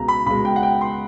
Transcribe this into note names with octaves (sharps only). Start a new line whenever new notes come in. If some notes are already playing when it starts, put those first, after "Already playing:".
Already playing: C#2 B2 G#3 A#5
B5
C#2 B2 G#3 B5
G5
F#5
G5
C6